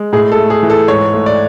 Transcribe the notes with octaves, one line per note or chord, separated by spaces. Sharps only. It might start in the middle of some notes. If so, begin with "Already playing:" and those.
Already playing: G#3
A2 G#4
A4
A3
G#4
E3
A4
G#2 C#5
A3
D5